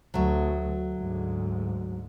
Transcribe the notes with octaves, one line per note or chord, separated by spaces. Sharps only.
D2 F#3 A3
D2 G#2